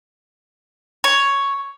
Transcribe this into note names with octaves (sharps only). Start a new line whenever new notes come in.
C#5